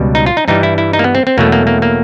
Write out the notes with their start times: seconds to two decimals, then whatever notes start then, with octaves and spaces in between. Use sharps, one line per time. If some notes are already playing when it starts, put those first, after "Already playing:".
Already playing: C#2 B2 G3
0.15 D#4
0.26 F4
0.37 D#4
0.48 G2 E3 G3 D#4
0.63 E4
0.78 E4
0.93 D#4
0.99 A#3
1.04 B3
1.15 C4
1.27 C4
1.38 E2 B2 F#3 A3 A#3
1.52 A#3
1.67 A#3
1.82 A#3